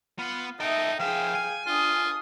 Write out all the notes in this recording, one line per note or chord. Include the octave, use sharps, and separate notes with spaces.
B3 F4 F#5
D#4 A4 D#5 E5 G5
F3 G#4 E5 F5 G5
G#5
D4 F4 D#6